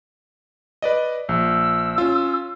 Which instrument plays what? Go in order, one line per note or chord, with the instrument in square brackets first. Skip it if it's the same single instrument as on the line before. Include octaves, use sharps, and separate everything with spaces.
[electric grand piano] B4 D5 D#5
[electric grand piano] A#1 [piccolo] E6
[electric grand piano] C#4 F4